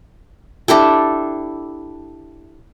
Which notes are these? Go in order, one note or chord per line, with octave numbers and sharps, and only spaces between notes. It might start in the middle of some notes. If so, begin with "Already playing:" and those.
D4 E4 G4 A4